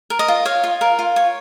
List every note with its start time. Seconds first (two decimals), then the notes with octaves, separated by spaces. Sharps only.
0.10 A#4
0.19 D#5
0.28 F4
0.45 C#5 F5
0.64 F4
0.81 A#4
0.99 F4
1.16 C#5